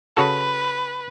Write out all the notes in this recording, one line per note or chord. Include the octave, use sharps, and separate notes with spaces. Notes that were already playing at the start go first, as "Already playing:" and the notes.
C#3 F#4 A4 B4